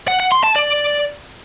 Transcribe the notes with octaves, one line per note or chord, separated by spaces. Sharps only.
F#5
F#5
C6
A5
D5